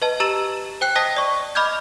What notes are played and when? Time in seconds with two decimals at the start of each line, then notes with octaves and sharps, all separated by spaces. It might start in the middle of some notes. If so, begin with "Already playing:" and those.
0.02 B4 D#5 A5
0.20 G4 A#5 E6 A6 E7 F#7
0.81 C5 G5 F#6 C7
0.96 C5 D#5 A5 D#6 A#6 B6
1.16 D5 C#6
1.55 D#5 B5 D6 F6 G6 G#6